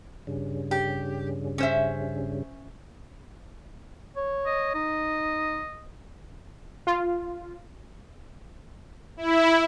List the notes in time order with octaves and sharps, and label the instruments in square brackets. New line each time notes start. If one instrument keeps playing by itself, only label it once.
[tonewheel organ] G2 C#3
[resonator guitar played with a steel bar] G4
C#4 C5 E5
[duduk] C#5
[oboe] D#5
[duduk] D#4 [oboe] D#5
[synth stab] F4
[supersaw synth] E4